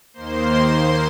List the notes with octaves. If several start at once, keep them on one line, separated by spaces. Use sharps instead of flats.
D#2 D#3 A#3 C5 C6